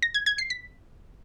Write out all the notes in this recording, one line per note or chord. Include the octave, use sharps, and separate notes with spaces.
A#6
G#6
G#6
C7
B6